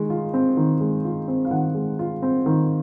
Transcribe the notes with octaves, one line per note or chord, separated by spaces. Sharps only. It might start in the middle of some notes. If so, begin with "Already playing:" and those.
Already playing: D#3 G#3
F4
C4
D#3
G#3
F4
C4
F5
D#3 F#5
G#3
F4
C4
D#3